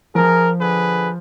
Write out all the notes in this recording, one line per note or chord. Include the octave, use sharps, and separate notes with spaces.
F3 G#4 A#4
D3 G#4 B4